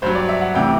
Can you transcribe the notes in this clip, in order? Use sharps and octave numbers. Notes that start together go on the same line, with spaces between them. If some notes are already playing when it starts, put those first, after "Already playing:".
G2 F#3 C5
D5
E5
F#5
D2 C3 E3 G5